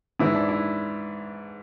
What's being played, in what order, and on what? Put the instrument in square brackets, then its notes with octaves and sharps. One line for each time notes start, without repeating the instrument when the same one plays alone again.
[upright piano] G#2 E3 E4
D4
E4